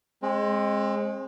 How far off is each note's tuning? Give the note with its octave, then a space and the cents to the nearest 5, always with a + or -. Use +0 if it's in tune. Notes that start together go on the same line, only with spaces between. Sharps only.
G#3 +0 C4 +35